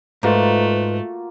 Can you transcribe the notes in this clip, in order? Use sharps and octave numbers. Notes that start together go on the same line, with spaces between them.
G#2 A3 A#3 F4 F#4 B4